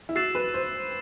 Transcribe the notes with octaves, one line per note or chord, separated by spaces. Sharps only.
E4
F#4 E6 A6 C7 E7
B4
C5